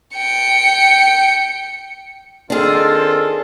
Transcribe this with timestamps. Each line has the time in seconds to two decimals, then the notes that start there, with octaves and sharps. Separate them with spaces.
0.16 G5 C#7
2.50 D#3 C4 D4 F4 G#4 A4